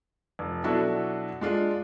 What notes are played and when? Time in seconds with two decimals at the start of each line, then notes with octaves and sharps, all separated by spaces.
0.39 F1
0.64 B2 F#3 D4 E4 F#4 A4
1.41 G#3 D4 F4